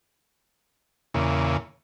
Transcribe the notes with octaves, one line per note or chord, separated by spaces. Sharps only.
E2 A#2 C#3